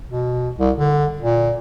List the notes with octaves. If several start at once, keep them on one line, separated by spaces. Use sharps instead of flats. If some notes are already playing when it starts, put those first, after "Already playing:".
B2
C2
D3
A#2